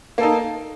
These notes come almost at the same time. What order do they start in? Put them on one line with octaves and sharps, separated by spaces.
A#3 A4 D#4